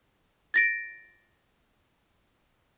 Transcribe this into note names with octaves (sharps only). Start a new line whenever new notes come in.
A6 A#6 D7